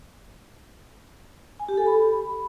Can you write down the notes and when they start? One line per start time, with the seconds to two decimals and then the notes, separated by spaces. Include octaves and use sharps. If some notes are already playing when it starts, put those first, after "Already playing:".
1.60 G#5
1.69 G4
1.77 A4
1.86 B5